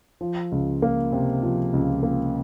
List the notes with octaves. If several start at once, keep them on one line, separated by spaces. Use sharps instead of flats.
F3
C#2
A#3
C3
F3
C#2
A#3